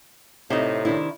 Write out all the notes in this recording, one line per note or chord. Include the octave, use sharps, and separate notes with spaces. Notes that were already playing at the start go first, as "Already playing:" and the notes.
A2 C3 D#4 D#5
D#3 D4 E4